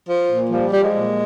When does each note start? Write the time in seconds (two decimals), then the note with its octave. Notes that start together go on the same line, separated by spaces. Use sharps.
0.09 F3
0.30 A#2
0.50 F3 G3
0.72 F3 G3
0.83 G#3
0.93 A#2